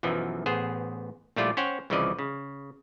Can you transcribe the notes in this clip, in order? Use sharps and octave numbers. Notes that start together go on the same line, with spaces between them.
B1 F#2 E3 F3
A1 B3 G#4 C5
A#1 G3 A3 E4 F4 D5
C#4 C5 C#5 F#5 G5
C2 C#3 E3 F3 D5 D#5
C#3